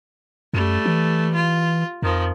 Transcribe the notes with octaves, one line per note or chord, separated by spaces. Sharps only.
F#2 G3 A3
E3
F4
F2 D#3 F3